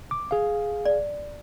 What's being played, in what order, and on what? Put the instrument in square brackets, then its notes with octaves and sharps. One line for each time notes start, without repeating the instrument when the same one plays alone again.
[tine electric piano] D6
G#4 F5
[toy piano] D5